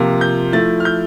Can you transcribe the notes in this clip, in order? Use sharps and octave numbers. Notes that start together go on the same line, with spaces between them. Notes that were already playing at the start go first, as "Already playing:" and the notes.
Already playing: C3 F3 A#3 F4
G6
F3 A3 E4 A6
F6
G6